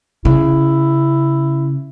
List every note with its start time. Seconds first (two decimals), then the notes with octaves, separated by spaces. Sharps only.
0.25 C#3 E4